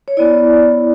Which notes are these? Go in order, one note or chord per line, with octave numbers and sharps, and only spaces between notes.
C#5
B3 E4 D5